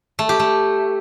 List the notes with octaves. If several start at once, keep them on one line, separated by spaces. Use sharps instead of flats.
A3
G4
A3